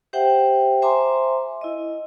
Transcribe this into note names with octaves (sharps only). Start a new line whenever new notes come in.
G4 C5 E5 F#5 G5
C5 E5 G#5 A#5 C6 D6
E4 D#5